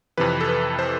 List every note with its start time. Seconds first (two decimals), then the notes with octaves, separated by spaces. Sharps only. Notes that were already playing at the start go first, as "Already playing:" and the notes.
0.18 F2 C3 E3 B4
0.40 A4
0.49 B4
0.79 C5